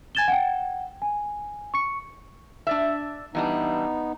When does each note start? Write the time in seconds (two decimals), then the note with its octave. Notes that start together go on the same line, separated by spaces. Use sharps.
0.15 G#5 G#6 A6 E7 G7
0.28 F#5 G5
1.02 G#5
1.74 C#6 C#7
2.67 D4 D5 E5
3.35 E3 G3 B3 D4 D#4